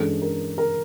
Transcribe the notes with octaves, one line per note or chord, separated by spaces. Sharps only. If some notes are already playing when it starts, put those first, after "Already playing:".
Already playing: G2 E3 G#3 C#4 A4
A#4
A#4